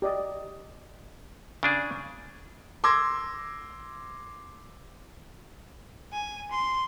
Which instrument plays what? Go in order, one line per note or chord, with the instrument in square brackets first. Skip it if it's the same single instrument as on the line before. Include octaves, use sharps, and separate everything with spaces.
[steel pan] G4 D5 D#5
[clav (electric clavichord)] C#3 D4 G#4
[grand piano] C6 D6 E6 G#6 A#6
[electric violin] G#5
C6